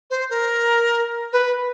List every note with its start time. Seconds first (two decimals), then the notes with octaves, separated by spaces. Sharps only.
0.10 C5
0.30 A#4
1.33 B4